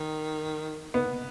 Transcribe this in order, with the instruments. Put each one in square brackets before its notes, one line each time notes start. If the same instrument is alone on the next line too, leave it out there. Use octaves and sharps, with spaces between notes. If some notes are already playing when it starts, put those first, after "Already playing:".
Already playing: [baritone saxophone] D#3
[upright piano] B3